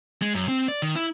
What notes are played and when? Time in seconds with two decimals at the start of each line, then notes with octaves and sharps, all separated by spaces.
0.22 G#3
0.35 F#2
0.48 C4
0.68 D5
0.82 D#3
0.96 E4